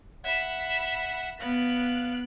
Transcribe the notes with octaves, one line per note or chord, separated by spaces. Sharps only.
E5 F#5 B5
B3 F5 F#6 D7